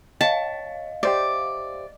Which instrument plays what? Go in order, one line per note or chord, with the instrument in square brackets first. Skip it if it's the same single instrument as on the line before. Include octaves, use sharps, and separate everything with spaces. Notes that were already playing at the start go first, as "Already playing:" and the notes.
[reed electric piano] C#5 [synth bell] D#5 F5 [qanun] A5
[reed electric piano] G4 C5 E5 [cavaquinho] D5